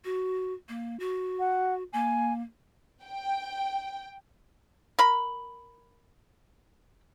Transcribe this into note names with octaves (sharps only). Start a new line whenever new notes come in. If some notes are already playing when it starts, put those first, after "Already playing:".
F#4
A#3
F#4
F#5
A#3 G#5
G5
A#4 B5